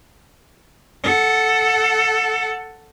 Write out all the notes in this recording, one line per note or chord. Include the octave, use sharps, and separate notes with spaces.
A4 F#5